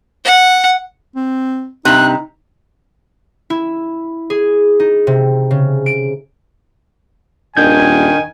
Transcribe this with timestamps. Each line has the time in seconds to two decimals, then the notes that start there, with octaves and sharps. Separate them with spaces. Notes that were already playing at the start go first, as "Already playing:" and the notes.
0.24 F#5
1.16 C4
1.85 G2 C3 D#4 F#6
3.50 E4
4.30 G#4
4.80 D#4
5.07 C3
5.51 C#3
5.86 D7
7.57 D#1 D#3 D4 G#5 G6 G#6